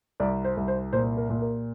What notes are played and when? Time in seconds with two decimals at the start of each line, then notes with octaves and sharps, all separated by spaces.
0.20 C2 D5
0.44 C5
0.57 C2
0.68 C5
0.93 A#2 C5
1.17 A#4
1.30 A#2
1.42 A#4